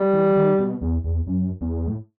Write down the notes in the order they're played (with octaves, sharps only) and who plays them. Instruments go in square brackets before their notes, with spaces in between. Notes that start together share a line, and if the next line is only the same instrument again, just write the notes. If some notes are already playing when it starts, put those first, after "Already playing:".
Already playing: [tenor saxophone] G3
[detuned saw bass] E3
D#3
B2
E2
E2
F#2
E2
A2